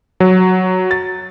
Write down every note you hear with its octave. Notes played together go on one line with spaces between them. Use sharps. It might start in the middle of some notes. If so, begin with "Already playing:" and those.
F#3
A6